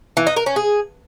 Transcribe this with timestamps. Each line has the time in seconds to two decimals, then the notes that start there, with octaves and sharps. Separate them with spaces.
0.17 E3
0.27 D#4
0.36 A#4
0.46 C#4
0.56 G#4